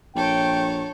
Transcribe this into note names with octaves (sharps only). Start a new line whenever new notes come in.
A#1 A4 C#5 G5